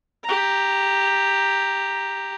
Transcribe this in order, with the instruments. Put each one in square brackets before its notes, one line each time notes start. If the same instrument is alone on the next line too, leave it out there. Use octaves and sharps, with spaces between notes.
[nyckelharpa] G4 A#5